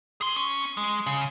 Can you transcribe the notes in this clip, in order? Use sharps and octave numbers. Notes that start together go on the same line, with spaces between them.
G#4 C6
C#4
G#3
C#3